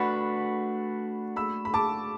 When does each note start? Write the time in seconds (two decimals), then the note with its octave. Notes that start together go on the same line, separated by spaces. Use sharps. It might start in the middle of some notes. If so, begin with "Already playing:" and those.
Already playing: A3 D4 F#4 B4 F#5 B5
1.36 B5 E6
1.65 B5
1.74 A5 D6